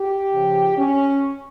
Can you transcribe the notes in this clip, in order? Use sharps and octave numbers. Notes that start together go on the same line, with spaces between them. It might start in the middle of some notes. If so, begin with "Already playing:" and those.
Already playing: G4
C#3 F3
C#4